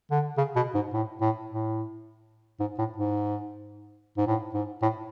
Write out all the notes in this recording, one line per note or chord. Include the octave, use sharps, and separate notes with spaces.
D3
C#3
B2
G#2
A2
A2
A2
G#2
A2
G#2
G#2
A2
G#2
A2